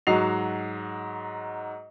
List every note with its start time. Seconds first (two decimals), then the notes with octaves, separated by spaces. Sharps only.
0.07 G#2 F#3 F#4 D#5 C7 F7